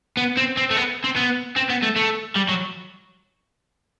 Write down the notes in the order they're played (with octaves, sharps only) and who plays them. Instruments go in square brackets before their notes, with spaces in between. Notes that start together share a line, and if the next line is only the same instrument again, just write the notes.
[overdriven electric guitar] B3
C4
C4
A3
B3
C4
B3
C4
B3
A3
A3
G3
F#3